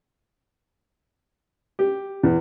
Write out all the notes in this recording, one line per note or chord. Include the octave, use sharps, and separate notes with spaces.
G4
E2